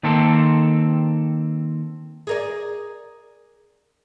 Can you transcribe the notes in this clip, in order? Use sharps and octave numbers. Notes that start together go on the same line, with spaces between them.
D#3 A#3 C4 A4
G#4 A#4 D5